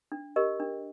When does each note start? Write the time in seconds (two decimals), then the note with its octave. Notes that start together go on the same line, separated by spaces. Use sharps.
0.12 D4
0.36 G4 A#4 D#5
0.60 D4